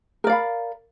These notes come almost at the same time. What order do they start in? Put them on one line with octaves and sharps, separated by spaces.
A#4 D5 F5 B5